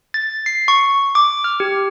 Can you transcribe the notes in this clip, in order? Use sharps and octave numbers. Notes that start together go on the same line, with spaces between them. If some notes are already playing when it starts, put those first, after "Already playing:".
A6
C7
C#6
D6
F6
G4